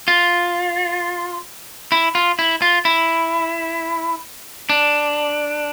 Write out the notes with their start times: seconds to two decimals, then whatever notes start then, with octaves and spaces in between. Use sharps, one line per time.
0.08 F4
1.92 E4
2.15 F4
2.39 E4
2.62 F4
2.85 E4
4.70 D4